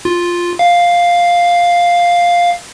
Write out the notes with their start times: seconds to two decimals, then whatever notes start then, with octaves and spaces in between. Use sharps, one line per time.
0.05 F4
0.59 F5